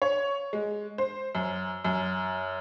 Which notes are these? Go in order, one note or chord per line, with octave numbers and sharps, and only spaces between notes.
C#5
G#3
C5
F#2
F#2